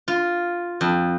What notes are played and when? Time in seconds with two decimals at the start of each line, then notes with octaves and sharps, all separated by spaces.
0.08 F4
0.81 F2